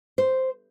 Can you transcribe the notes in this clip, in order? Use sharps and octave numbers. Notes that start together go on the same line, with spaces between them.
C5